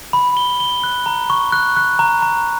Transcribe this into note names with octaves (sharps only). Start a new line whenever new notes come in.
B5
G7
G7
F#6
A#5
C#6
F#6
F#6
A#5
A#5